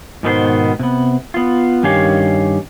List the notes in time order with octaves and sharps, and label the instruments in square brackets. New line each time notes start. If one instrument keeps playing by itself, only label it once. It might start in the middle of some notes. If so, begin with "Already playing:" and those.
[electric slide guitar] G#2 B2 D#3 B3 G4 C5
C3 B3
B3 F4
G2 D#3 C#4 G4 C#5 F5